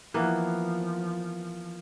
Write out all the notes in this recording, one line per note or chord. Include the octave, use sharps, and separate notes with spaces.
E3 F3 A#3 B3